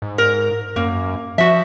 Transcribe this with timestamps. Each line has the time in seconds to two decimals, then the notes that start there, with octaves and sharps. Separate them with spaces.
0.02 G#2
0.18 A#4
0.76 F#2 A#3
1.38 F3 F#4 E5